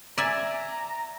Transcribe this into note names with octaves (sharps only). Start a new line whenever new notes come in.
D5 E5 G#5 A#5